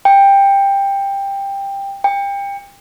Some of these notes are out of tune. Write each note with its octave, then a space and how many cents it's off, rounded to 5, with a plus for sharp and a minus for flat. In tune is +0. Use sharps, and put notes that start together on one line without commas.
G5 +15
G5 +30